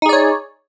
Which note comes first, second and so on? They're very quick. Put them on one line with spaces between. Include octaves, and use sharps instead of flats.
D#4 G#4 D5 C#5